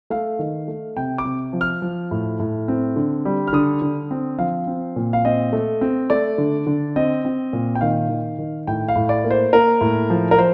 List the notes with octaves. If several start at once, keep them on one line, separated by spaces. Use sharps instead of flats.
A3 F5
D#3
A3
C3 G5
D6
C3
F3
F6
F3
A2
A2
C4
D3
G3
F6
D3 D#6
D3
C4
F3 F5
C4
A#2
F5
C4 D#5
A3
C4
A3 D5
D3
D3
C4 D#5
C4
A#2
G5
D#3 F5
D#3
D#3
A2 G5
F5
A2
D5
A#3
C5
A#3 A#4
A2
F3
A#4
F3 C5